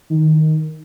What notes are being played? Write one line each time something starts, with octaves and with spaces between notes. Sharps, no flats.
D#3